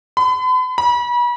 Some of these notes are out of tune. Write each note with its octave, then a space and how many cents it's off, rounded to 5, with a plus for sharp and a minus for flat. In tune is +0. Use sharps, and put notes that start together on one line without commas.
B5 +45
B5 -35